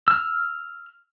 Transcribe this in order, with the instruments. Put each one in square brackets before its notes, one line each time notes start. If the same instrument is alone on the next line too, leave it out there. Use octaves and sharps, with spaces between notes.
[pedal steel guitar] E6 F6